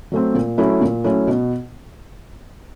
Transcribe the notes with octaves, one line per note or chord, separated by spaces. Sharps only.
F#3 A3 C4
A#2
F#3 A3 C#4 E4
A#2
F#3 A3 C#4 E4
B2